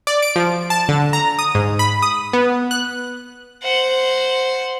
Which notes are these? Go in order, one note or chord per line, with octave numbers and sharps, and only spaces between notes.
D5
D7
F3
A5
D3
A#5
D#6
G#2
B5
D#6
B3
F#6
C5 F#5